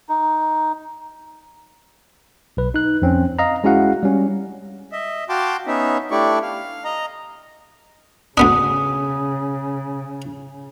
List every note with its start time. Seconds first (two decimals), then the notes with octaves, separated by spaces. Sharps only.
0.09 D#4
2.57 B1 B4
2.74 D#4 F#6
3.02 F2 C4 C#4
3.39 D#5 F5 A#5
3.64 G#3 C#4 E4 F#4 F5 F#5
4.03 G3 C#4
4.92 D#5 E5
5.29 F#4 F5 G5 A5 C6 D6
5.67 B3 C#4 D#4 E5
6.11 A3 D4 E4 G4 D5 C#6
6.42 F5
6.84 D#5 A#5
8.37 D2 C#3 B3 D4 D#6